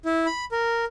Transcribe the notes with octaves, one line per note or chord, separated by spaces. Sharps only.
E4
B5
A#4